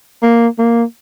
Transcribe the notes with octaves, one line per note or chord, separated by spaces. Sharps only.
A#3
A#3